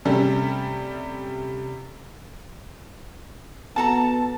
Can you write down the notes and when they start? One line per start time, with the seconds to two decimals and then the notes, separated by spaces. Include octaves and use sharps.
0.05 C3 G3 A3 C#4
3.76 B3 F#4 A4 A5 A#5